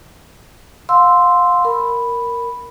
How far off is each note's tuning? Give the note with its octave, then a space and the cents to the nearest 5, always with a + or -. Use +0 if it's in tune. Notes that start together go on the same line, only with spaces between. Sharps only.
F5 +30 C6 -5 E6 +0
A#4 -5 B5 +0